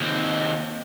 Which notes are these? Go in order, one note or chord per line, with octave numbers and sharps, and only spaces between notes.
D#2 C4